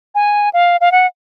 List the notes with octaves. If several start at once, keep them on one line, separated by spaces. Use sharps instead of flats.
G#5
F5
F5
F#5